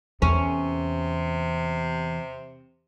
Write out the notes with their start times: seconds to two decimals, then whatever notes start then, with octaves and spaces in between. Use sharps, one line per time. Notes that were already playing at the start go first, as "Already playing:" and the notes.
0.22 E2 C3 C#4